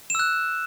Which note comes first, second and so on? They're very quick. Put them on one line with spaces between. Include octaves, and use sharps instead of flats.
E7 E6 F#6